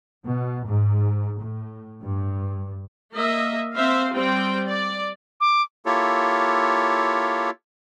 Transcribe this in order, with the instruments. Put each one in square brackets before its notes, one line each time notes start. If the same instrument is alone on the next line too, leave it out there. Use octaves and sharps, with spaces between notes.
[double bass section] B2
G#2
A2
G2
[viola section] A#3 D#5 E5
C4 C5 E5 F5
G3 C4 C5 G5
D5
[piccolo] D6
[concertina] A#3 E4 F4 G4 A4 C#5